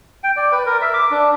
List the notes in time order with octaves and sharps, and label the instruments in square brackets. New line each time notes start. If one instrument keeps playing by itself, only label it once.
[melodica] G5
D5
B4
A#4
E5
D6
D4